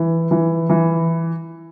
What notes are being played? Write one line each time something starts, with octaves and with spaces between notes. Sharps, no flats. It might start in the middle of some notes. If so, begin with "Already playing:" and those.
Already playing: E3
E3
E3